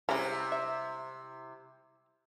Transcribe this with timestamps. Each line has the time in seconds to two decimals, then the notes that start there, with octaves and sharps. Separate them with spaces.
0.09 C3 G3 G#3 C#4 E4 A#5
0.52 E5